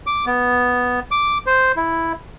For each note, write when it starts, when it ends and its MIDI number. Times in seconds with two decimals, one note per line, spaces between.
0.07 0.26 86
0.26 1.00 59
1.11 1.38 86
1.46 1.72 72
1.76 2.13 64